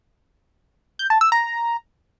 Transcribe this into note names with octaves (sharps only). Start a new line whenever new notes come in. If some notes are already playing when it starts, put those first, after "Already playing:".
G6
A5
E6
A#5